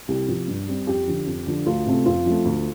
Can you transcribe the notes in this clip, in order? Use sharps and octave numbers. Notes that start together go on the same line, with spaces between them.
C2 G4
C3 F3
G2
G3 C4
F2 G4
D3 F3
F2
D3 F3
D2 F4
C3 A3 C4
F2 F4
F3 A3 C4
D2